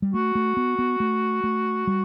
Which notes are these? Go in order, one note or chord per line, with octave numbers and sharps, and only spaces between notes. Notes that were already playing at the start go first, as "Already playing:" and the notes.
G3
A3 F#4
A3
B3
B3
A3
A3
G3